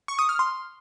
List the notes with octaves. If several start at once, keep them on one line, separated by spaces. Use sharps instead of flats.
C#6
D#6
F6
C6